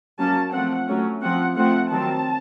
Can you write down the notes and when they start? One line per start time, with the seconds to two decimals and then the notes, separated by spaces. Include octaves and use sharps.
0.18 F#3 A#3 C#4 A5
0.52 F3 A3 C4 F#5
0.88 F#3 A3 C#4
1.21 F3 C4 F#5
1.56 F3 A3 C4 F#5
1.90 D#3 F#3 C4 A5